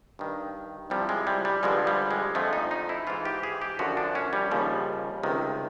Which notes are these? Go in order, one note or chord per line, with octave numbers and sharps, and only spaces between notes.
G2 D#3
C2 C3 F3 G3
G#3
G3
G3
G2 D3 F3 G#3
G3
G#3
F2 D3 F3 A3
D#4
D#4
E4
G#2 E3 F4
G4
G#4
G4
F#2 D3 F3 F#4
D4
C#4
G3
D#2 C#3 F3
C#2 C3 D#3